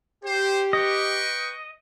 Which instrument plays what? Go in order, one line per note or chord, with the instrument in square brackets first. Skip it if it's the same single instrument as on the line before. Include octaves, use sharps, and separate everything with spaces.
[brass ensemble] G4 [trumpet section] C5
[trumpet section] B4 G5 C#6 [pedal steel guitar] D#5